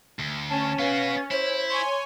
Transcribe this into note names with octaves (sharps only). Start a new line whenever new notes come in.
D2
C#4 A5
B3 F#4 B4 F5
E4 C5 C#5
C#5 G#5 C6